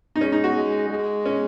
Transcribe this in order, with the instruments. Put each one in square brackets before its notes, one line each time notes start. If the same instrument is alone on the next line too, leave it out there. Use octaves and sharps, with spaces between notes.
[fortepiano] D#4
[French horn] G#3 [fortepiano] C#4
[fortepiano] D#4
F#4
[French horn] G#3
G#3
[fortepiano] C#4